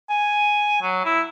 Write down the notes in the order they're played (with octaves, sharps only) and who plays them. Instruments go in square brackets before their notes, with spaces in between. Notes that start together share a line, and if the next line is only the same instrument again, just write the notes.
[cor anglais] G#5
F#3
E4